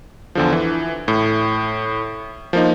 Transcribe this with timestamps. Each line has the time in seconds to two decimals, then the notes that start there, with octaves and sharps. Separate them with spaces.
0.35 E2 D3 F3
0.53 E3
1.08 A2
2.53 F3 A#3 D#4